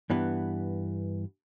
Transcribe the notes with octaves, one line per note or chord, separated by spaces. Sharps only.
G2 E3 B3